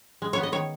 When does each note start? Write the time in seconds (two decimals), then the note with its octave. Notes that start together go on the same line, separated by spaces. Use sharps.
0.22 G#3
0.33 B3 C#5
0.43 D#5
0.52 D#3 C#5